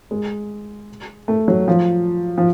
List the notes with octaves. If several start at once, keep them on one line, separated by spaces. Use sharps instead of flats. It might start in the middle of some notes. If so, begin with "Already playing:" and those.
G#3
A3
F#3
F3
F3